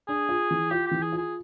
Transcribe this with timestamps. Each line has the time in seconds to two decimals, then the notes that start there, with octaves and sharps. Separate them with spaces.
0.08 D4 G#4
0.29 F4
0.50 E3
0.71 F4 G4
0.86 E3 G4
1.02 G#4
1.12 F4
1.18 G#4